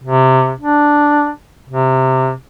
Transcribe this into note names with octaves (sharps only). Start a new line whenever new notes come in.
C3
D4
C3